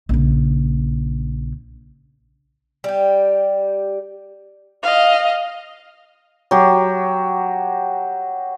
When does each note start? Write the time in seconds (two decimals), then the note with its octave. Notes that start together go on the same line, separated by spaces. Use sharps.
0.09 A#1 C#3
2.84 G3 G4
4.83 D#5 F5
6.51 F#3 G4